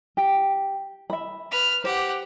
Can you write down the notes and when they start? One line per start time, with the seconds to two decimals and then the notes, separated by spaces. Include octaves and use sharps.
0.17 G4
1.10 E5 B5
1.51 B4 F6
1.84 G4 C5 F#5